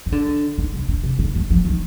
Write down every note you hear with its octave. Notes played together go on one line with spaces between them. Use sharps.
D#3
D3
D#3
C3
D3
C3
D#3
D#3
F3
D#3